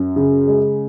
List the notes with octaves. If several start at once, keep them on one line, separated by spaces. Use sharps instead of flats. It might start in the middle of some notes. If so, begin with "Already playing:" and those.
Already playing: F#2
C#3
G#3